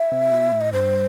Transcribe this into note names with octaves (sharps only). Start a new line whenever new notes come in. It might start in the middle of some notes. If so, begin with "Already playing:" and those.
Already playing: E5
C3
B2
A2
D#5
G2 C5